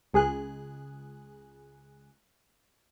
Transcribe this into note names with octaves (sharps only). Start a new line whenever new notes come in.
C#2 G#4 F#6